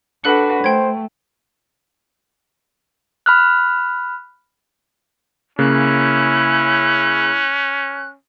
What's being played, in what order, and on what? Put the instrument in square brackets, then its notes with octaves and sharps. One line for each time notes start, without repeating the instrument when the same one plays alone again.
[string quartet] D4 F#4 B4 [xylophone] A4 F#6 C#7
[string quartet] A3 [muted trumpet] C5 [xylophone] G5 G#6
[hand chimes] B5 F6 F#6
[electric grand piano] C#3 A#3 [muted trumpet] C#4 [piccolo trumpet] E4 [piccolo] F#6